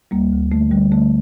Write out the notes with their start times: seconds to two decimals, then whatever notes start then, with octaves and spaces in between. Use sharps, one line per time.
0.11 D2 G3 A#3
0.32 D2
0.52 D3 A3
0.72 D3 G3
0.92 D3 A3